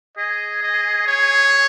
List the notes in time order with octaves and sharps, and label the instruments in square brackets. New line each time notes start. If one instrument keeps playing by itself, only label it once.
[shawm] G#4 [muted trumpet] D#5
[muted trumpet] D#5
C#5